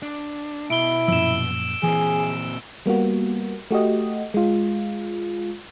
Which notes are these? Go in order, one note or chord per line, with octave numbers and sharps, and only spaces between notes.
D4
B2 E4 D7 G7
F#2 A#2 F3 E6 E7
A#2 E3 C4 G#4
G3 A#3 B3 F#4
A3 F#4 G4 D#5
G#3 F4